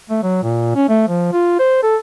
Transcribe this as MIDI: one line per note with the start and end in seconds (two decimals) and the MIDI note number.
0.10 0.22 57
0.23 0.38 54
0.43 0.72 46
0.75 0.88 61
0.89 1.04 57
1.08 1.30 53
1.33 1.58 65
1.59 1.81 72
1.83 1.97 69